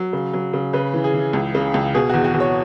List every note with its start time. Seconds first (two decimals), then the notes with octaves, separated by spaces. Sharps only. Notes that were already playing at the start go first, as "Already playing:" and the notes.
Already playing: F#3
0.13 C#3
0.33 F#3
0.53 C#3
0.73 C#3 B4
0.94 E3
1.04 G#4
1.14 E3
1.33 C#2
1.55 C#3
1.74 C#2
1.94 B2 G#4
2.09 E2 F#4
2.24 F#4
2.34 E2
2.40 C#5